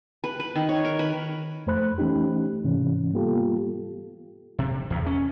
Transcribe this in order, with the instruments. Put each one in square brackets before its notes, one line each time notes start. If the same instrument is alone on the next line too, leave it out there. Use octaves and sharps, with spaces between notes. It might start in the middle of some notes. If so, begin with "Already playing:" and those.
[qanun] B4
B4
D#3
C#5
A#4
B4
[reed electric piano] F2 A3 C5 B5 F#6
E3 A3 C#4 D#4 G4
G#2 C3 E3 C#4
G3 A#3 B3 F4 G4 A4
[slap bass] C3
E2
C#4